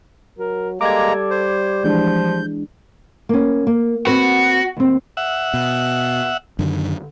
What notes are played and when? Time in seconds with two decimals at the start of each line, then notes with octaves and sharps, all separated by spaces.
0.38 F#3 A#4
0.81 G3 G#3 A#3 A4 A#5 D6 G#6
1.31 C5
1.84 E3 F3 G#3 D4 G6
3.29 A#3 C#4
3.67 A#3
4.07 C4 F#4 B4
4.77 D#2 C4
5.17 E5 F#5
5.54 B2
6.59 F#2 D3 D#3